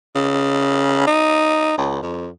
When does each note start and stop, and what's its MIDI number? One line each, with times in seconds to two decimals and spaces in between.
0.16 1.06 49
1.07 1.76 63
1.77 1.97 37
2.02 2.28 41